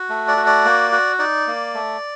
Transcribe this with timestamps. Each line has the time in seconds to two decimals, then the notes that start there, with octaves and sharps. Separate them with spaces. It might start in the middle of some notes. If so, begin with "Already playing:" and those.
Already playing: F#4
0.09 A3
0.28 D5
0.37 F#4
0.46 D5
0.65 A#3
0.92 F#4
1.19 D#4 D5
1.47 A#3
1.74 A3